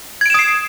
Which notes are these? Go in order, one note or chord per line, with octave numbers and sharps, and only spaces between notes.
D#6 G#6 C7 D7 E7